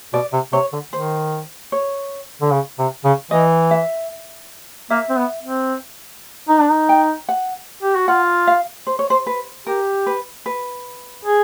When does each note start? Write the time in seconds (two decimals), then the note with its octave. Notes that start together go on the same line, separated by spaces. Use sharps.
0.13 B2 D5
0.33 C3
0.53 C3 C#5
0.73 D3
0.93 D#3 C5
1.72 C#5
2.42 D3
2.52 C#3
2.79 C3
3.04 C#3
3.31 E3 D#5
3.71 E5
4.90 A#3 E5
5.10 C4
5.17 B3
5.43 C4
6.49 D#4
6.60 D4
6.71 D#4
6.89 G5
7.29 F#5
7.83 G4
7.95 F#4
8.08 F4 F#5
8.47 F5
8.87 C5
8.99 C#5
9.10 C5
9.27 B4
9.67 G4 A#4
10.07 B4
10.46 B4
11.25 G#4